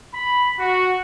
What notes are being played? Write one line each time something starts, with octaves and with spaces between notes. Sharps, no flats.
B5
F#4